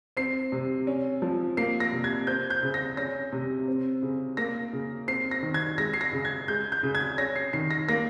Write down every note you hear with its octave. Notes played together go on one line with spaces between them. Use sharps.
C4 C7
C3
C#4
F3
A#3 C7
A#6
C3
G#6
C4 G6
G6
C#3
A#6
C#4 A#6
C3
C4
C#3
A#3 A#6
C#3
C4 C7
A#6
D#3
G#6
G#3 A#6
C7
A#6
C#3
G#6
G#3 G6
G6
C#3
G#6
C#4 A#6
C7
D#3 C7
A#6
A#3 A#6